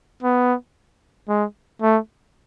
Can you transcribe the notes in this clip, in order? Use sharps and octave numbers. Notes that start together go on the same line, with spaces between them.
B3
G#3
A3